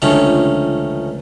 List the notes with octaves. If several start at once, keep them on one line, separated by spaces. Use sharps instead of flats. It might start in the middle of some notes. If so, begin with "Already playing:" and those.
C#2 D3 D#3 F3 A3 C#4